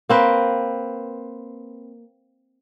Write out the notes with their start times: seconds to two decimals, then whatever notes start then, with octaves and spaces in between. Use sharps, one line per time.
0.09 A#3 C4 B4